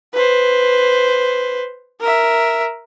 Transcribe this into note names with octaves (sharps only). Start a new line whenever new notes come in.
B4 C5
A#4 E5